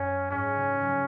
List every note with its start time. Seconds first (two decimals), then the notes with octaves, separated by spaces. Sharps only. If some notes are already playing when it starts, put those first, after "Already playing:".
Already playing: F#2 C#4
0.31 G#2 C#4
0.56 C#3
0.81 F#3